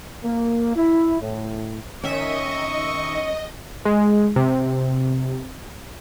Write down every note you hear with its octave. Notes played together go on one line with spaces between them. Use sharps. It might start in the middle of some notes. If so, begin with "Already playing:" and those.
A#3
E4
A2
D#3 C#4 D#5 E5 C#6 D#7
G#3
C3